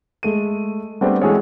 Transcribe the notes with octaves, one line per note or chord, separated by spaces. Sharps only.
G#3 A3 D#7
G3 A3 B3 C4 D4 G4
E3 G#3 F#4 G#4 A4 C#5